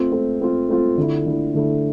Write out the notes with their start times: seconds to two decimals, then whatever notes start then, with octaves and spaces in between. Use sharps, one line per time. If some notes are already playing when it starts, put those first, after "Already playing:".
Already playing: A3 C4 F4
0.12 A3 C4 F4
0.40 A3 C4 F4
0.69 A3 C4 F4
0.97 D3 A3 E4
1.26 D3 A3 E4
1.54 D3 A3 E4